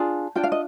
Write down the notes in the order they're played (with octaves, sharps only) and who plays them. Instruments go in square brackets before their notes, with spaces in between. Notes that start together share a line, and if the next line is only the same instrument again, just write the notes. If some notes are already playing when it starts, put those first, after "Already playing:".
Already playing: [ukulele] D4 F4 G#4
D4 F4 G5
F5
D#5